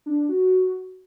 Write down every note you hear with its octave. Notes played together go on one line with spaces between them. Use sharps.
D4
D4
F#4